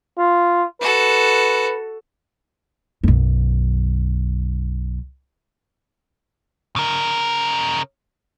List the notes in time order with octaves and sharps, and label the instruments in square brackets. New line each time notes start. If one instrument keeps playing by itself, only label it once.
[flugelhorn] F4
[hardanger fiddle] F#4 A4 [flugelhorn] B4
[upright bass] B1 F#2
[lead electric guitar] C#3 A#4